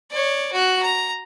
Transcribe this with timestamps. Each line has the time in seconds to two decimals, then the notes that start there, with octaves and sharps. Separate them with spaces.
0.11 C#5 D5
0.52 F#4 F#6
0.83 A#5